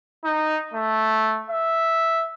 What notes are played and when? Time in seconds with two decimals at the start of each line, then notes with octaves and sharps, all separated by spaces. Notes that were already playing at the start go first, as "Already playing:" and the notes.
0.24 D#4
0.74 A3
1.50 E5